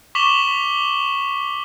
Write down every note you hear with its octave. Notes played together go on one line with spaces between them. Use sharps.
C#6 D6 B6 E7 F#7 G7